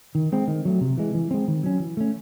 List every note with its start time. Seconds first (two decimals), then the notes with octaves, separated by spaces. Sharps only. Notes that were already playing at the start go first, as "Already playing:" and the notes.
0.15 D#3
0.32 G#3 C4
0.48 D#3
0.65 F#3 A3
0.81 C3
0.98 E3 G#3
1.15 E3
1.31 G#3 C4
1.48 D#3
1.64 F#3 C#4
1.80 E3
1.97 A3 C#4